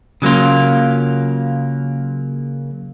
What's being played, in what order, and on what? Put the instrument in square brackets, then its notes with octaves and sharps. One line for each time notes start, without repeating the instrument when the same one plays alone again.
[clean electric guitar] C#3 F#3 A#3 F4